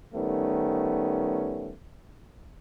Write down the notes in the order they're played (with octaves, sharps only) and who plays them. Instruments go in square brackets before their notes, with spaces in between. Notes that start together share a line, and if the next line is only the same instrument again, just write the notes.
[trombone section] D#3 G3 A3 B3 C#4